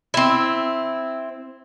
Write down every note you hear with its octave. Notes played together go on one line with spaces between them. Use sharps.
C4 E4